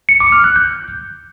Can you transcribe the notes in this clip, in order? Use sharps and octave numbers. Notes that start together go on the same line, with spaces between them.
C#7
D6
F6
F#6
G6